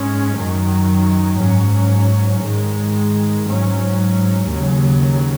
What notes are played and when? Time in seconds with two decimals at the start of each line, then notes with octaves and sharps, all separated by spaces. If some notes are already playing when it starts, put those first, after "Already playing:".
Already playing: G#2 G#3 C#4
0.34 F#2 D#3 F#3
1.37 G#2 F#3 C#4
2.41 G#2 D#3 G#3
3.45 G#2 F#3 C#4
4.47 D#2 C#3 F#3